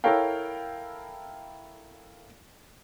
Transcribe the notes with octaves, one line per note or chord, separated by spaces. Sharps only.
E4 A4 A#4 C#5 F5 G5